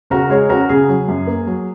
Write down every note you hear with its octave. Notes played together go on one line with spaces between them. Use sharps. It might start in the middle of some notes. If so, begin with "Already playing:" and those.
C#3 F#4 A#4
G#3 G#4 C#5
C#4 F#4 A#4
C#3 G#4
F#3
F#2
A#3
F#3